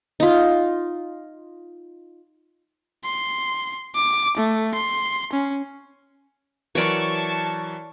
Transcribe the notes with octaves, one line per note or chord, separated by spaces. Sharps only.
D#4 F4
C6
D6
A3
C6
C#4
E3 F#3 A#4 C#5 D5 A5 C#6